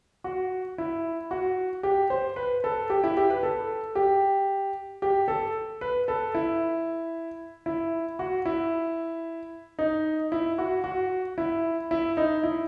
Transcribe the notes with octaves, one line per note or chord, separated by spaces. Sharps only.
F#4
E4
F#4
G4
C5
B4
A4
G4
E4
G4
B4
A4
G4
G4
A4
B4
A4
E4
E4
F#4
E4
D#4
E4
F#4
F#4
E4
E4
D#4
E4